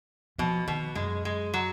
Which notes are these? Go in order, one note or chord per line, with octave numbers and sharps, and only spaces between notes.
B2 F3
B2 D#3
F#2 G#3
G#3
F#3